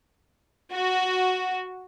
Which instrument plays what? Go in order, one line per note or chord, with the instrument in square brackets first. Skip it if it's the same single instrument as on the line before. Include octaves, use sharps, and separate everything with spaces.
[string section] F#4